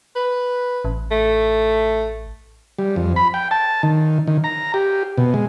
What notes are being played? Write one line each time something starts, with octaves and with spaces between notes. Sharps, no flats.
B4
A1
A3
G3
F2
B5
G5
A5
D#3
D#3
A#5
G4
B2
G#3